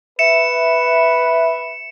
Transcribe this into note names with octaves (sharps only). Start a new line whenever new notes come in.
B4 E5 C#7 E7